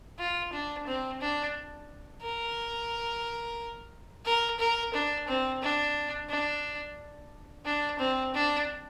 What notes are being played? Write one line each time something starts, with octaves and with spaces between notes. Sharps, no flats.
F4
D4
C4
D4
A#4
A#4
A#4
D4
C4
D4
D4
D4
C4
D4